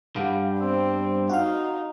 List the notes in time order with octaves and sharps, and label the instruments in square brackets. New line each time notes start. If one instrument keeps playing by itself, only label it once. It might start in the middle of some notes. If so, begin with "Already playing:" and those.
[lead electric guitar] G2 G3 [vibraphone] F5 F#5 B5
[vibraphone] B3 C5 E6 [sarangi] C4
[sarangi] D#4 [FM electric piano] F#4 F5 [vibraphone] A#5